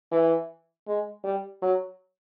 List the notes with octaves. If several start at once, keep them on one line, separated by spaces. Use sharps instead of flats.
E3
G#3
G3
F#3